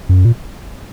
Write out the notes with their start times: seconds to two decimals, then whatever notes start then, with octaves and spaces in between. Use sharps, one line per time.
0.09 F#2
0.25 A#2